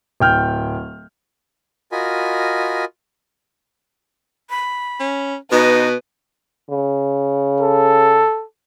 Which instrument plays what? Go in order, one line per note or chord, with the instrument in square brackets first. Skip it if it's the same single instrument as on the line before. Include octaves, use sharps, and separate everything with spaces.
[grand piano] D1 G5 F6 G6
[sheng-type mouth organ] F4 F#4 A#4 D#5 G#5 B5
[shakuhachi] B5
[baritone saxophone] C#4
[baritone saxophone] B2 [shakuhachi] D#4 [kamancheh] B4
[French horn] C#3
[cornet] A4